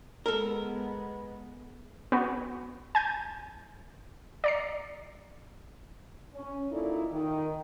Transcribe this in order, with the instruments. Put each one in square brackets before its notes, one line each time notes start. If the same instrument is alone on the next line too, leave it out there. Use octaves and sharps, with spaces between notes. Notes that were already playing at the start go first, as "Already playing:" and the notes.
[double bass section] G#3 B3 [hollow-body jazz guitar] A4 A#4
[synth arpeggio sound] B3 F#4
G#5 G6 A6
D5 A#5 C7
[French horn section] C#4
A#2 D#4 E4 A4 D5
D#3